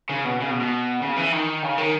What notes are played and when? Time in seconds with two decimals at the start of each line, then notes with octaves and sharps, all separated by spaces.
0.09 C#3
0.24 B2
0.40 C#3
0.50 B2
0.60 B2
1.01 C#3
1.16 E3
1.32 D#3
1.62 C#3
1.78 D#3